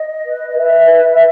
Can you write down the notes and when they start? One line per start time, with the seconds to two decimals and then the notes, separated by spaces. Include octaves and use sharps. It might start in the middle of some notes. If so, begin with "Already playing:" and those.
Already playing: D#5
0.26 B4
0.49 D#5
0.58 B4 E5
0.91 B4